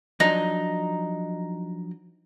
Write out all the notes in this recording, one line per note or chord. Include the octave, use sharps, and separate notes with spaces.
F3 F#3 D4 D#4